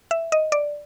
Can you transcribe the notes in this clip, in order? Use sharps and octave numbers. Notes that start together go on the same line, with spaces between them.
E5
D#5
D5